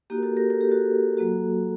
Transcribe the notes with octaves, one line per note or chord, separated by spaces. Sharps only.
A#3 D#4 F#4 G4
A#4
F#4 A4
G4 A#4
A4
G4
F#4 A4
F#3 A#3 F#4